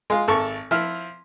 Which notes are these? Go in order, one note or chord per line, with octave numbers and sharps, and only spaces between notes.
G#3 F4
G#1 A4 C#6
F3 E4 F6